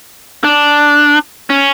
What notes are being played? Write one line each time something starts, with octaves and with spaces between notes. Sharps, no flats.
D4
C#4